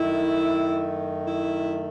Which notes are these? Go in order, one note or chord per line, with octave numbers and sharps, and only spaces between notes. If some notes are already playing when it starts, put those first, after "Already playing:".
Already playing: F#2 D#3 A3 E4
E4